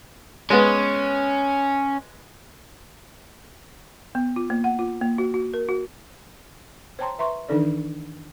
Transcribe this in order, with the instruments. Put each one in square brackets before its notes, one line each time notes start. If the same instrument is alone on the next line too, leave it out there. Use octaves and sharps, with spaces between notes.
[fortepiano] G#3 B3 [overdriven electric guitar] C#4
[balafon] B3
F4
A#3
F#5
F4
A#3
F#4
F#4
A#4
F#4
C5 C#5 G5 A5 A#5 C6
B4 E5 A#5 C6 C#6
D#3 E3 D4 D#4 A4 D5